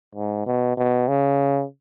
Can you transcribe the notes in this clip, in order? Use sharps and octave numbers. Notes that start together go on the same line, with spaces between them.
G#2
B2
B2
C#3